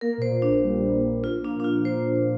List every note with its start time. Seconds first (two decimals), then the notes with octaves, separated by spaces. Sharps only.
0.01 A#3 A#4
0.18 A#2 C5
0.32 A#3
0.42 D4
0.48 A#1
0.63 G3
0.79 G3
0.93 A#2
1.09 A#1
1.23 F3 F4
1.39 A#3
1.45 D4
1.55 A#2 D4
1.64 F4
1.69 A#3
1.84 A#2 C5
2.00 A#2
2.16 A#2